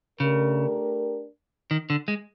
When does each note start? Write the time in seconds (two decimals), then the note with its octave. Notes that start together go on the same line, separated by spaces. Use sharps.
0.20 C#3 A3 D4 G4 A#4
1.71 D#3
1.90 D3
2.08 G#3